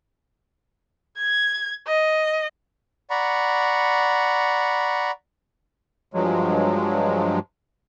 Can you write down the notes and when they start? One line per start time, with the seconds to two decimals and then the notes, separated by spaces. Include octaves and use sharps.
1.18 G#6
1.87 D#5
3.10 D5 F#5 A#5 B5 C#6
6.13 G2 F3 F#3 G#3